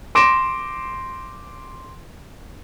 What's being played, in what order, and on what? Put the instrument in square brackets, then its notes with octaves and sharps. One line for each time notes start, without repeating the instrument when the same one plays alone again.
[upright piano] C6 D6 A#6 D7 E7